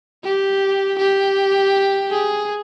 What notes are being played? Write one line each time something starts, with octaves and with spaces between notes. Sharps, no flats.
G4
G4
G#4